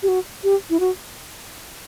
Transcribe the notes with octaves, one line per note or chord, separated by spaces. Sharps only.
G4
F#4
G4
E4
F#4